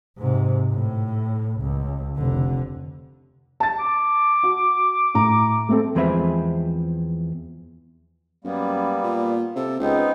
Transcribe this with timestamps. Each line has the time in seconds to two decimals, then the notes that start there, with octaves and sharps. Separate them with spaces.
0.17 G#2 C3
0.72 A2
1.61 C#2
2.16 F1 D3
3.60 A5 A6
3.79 D6
4.43 F#4
5.15 A2 A#5
5.69 A3 C4 A4
5.95 E2 F3 G#3 C4 B4 E5
8.45 F#2 G3 A#3 B3
9.03 A#2
9.56 C3 A4
9.80 C#2 B3 C4 D#4